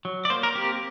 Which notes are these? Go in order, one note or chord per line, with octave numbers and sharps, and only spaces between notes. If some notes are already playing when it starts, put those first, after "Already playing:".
F#3
D5
A#3 C5
A#4
C4 G4